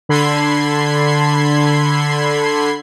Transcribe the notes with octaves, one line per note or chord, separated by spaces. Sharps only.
D3 A4 B5 C6 G#6 C7